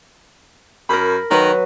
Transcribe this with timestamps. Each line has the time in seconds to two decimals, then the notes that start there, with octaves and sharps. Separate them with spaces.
0.89 F#2 A#4 B5
1.31 D#3 F#3 B4